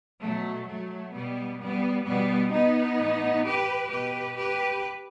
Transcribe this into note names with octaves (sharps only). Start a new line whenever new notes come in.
B2 F#3 A3
F#3 A3
B2 G3 B3
G3 B3
B2 G3 B3
B3 D#4
A2 E3
G4 B4
B2 G4 B4
G4 B4